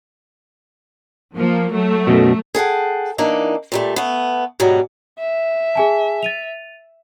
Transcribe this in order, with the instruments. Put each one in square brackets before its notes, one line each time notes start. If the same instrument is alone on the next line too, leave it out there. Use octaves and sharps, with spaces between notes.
[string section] F3 A#3
F#3 A3
[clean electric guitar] F#2 B2
[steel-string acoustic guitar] G#4 A4 F#5 G5
E3 A#3 D4 D#4
A#2 G3 A3
A3 B3
G#2 B2 F#3 G3
[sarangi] E5
[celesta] G#4 G#5 A5
A6 D#7 F7